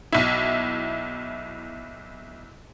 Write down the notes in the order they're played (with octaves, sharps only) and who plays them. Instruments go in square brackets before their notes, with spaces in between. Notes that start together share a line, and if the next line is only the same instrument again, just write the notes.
[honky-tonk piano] B1 E4